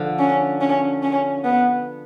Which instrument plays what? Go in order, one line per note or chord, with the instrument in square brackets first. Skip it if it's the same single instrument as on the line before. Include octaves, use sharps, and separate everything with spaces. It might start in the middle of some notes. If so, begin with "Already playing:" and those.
Already playing: [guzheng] D3 F3
[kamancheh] C#4
C#4
C#4
B3